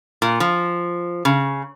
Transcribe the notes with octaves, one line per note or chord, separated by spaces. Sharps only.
A#2
F3
C#3